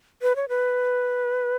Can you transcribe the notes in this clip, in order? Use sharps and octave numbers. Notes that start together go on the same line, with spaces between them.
B4
C#5
B4